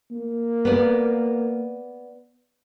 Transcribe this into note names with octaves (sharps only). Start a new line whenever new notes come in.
A#3
B3 D5